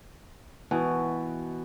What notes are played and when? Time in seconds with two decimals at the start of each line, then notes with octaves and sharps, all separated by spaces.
0.71 B2 E3